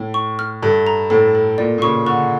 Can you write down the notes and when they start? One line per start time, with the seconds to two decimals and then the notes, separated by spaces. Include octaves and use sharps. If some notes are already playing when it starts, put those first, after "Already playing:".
Already playing: A2
0.14 C#6
0.39 F6
0.63 G2 A4
0.87 A#5
1.10 A2 A4
1.35 A4
1.58 A#2 D5
1.78 A#2
1.82 C#3 C#6
2.06 D3 C#6